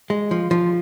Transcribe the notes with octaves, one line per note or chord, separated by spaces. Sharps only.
G#3
F3
F3